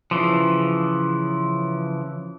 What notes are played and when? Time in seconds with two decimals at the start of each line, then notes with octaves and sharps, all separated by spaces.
0.11 C#3 E3 F3